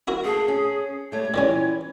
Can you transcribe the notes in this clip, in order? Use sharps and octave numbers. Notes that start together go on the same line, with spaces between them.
E4 F#4 A#4
A#3 G#4 A4
C#4
G3 A3 C#5
A#2 D#3 E3 G3 C#4